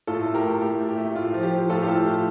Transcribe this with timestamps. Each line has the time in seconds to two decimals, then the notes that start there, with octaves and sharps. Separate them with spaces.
0.07 A2 F4 A4
0.26 A3
0.34 G4 A#4
0.43 A2
0.62 A3 G4
0.80 A2
0.89 G4
0.98 A3
1.15 A2 F4
1.34 F3
1.43 G4
1.52 F3
1.69 A2 F4 A4
1.82 G4
1.88 A3 F4 A4
2.06 A2 G4